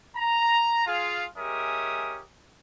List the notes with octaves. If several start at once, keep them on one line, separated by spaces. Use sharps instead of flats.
A#5
F4 G#4 F5
G#3 C#4 G4 A#4 E5 D#6